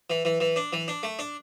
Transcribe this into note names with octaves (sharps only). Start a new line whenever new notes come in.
E3
E3
E3
D4
E3
D4
A3
D4